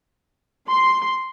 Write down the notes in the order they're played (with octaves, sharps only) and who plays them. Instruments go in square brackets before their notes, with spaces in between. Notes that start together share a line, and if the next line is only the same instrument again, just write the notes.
[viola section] C6